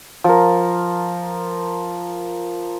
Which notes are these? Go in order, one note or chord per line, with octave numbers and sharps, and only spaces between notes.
F3 A#4